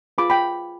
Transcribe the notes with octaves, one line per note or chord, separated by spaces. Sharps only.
F4 G#4 B4 B5 D6
G5 B5